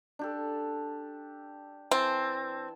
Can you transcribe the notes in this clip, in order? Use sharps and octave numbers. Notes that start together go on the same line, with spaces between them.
D4 G4 A4
E3 C4 G5 A5